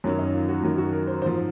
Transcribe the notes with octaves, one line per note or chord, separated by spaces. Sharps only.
F#2 D#3 F#3 C#4
D#4
F4
F#4
F#2 D#3 F#3
F#4
A#4
C5
G#2 F3 C5